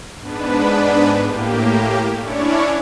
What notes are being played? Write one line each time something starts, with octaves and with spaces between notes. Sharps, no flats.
G#2 B3 D4 B4
A2 A#3 G4
C#4 D4 E4 C#5 D5